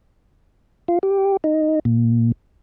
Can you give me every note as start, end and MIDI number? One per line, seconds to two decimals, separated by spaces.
0.88 0.98 65
1.03 1.37 67
1.44 1.79 63
1.85 2.32 46